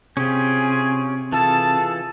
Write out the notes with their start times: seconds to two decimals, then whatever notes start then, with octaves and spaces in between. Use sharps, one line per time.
0.17 C3 C#4 F4 G4 G#4 G#5
1.32 E3 F4 G#4 A4 A5